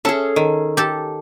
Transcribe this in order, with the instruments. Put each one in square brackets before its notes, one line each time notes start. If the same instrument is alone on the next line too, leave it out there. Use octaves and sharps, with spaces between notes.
[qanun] C#4 G#4 [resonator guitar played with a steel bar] A4 A5 [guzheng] E5
[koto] D#3
[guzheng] G4 A4 A5